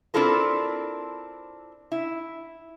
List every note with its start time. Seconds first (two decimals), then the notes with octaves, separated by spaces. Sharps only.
0.14 C4 D4 E4 F4 A4 A#4
1.92 E4